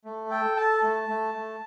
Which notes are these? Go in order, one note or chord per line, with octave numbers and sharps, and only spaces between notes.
A3
A4 G5
A4 A5
A3
A3
A3